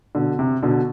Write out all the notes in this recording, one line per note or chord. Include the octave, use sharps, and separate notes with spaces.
B2 D3
C3
B2 D3